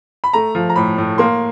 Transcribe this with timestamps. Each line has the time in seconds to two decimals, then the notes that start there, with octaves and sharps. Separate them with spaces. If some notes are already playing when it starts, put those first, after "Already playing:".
0.24 B5
0.33 A3 A#5
0.55 F3
0.70 A#5
0.76 A2 B5
0.98 A2
1.18 A#3 C6